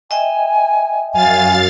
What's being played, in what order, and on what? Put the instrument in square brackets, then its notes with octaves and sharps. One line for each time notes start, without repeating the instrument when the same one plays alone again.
[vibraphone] D#5 E5 G5 [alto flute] G#5
[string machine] F#2 F5 A6 [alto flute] G#5